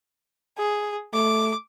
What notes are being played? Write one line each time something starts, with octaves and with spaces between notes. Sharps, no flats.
G#4
A3 D6